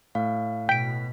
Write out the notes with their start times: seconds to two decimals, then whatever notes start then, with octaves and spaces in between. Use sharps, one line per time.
0.15 A2 F5
0.69 B2 G5 B6 D7